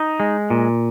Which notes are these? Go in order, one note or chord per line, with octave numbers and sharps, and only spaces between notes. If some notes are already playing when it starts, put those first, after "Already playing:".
Already playing: D#4
G#3
A#2